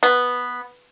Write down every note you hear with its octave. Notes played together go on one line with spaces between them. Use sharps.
B3